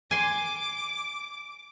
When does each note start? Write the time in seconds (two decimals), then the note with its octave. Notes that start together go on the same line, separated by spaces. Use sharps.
0.11 G#5 C6 D6